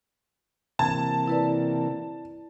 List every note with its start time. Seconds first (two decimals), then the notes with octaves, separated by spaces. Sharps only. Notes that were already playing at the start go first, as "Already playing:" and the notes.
0.79 C3 E3 A#3 A5 G#6
1.28 E4 B4 D5